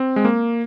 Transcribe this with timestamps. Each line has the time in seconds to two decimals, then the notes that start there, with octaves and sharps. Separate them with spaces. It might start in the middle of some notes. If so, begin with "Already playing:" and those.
Already playing: C4
0.16 G#3
0.25 A#3